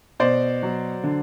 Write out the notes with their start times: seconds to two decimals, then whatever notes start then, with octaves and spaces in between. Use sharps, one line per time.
0.20 B2 C5 D5
0.63 F#3
1.04 D3